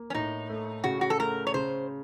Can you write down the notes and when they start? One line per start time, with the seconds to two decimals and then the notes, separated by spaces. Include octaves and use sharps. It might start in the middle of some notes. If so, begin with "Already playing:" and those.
Already playing: A#3
0.10 C#4
0.15 A2 D#4
0.49 A3
0.84 C#3 F#4
1.01 F#4
1.10 A4
1.19 A3 A#4
1.47 C#5
1.54 C#3 C5